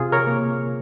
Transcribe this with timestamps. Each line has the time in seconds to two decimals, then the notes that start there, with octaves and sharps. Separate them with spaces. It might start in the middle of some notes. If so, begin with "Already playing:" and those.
Already playing: C3 F4 G#4
0.12 A#4 C#5
0.27 A#3